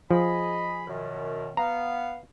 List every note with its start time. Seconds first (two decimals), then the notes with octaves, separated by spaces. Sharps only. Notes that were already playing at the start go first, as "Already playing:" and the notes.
0.11 F3 G#4 D#5 B5
0.87 F#2 B2 D#3
1.57 B3 F5 A#5